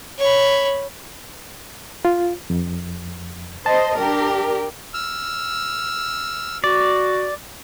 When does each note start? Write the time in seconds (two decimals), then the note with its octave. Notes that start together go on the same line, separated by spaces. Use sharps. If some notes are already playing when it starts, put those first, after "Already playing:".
0.19 C#5 B5
2.05 F4
2.50 F2
3.66 C5 D#5 A5
3.97 D4 G4 A#4
4.94 E6 F6
6.64 F#4 D5